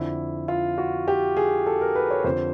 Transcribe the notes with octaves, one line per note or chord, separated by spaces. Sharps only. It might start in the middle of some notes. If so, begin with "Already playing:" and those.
Already playing: F2 D3 E4
F4
F#4
G4
G#4
A4
A#4
B4
C#5
F2 D3 C5